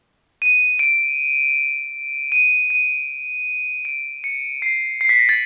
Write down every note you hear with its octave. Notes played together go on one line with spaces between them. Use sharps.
D#7
D7
D#7
D#7
D7
C#7
C7
C7
B6
A#6
A6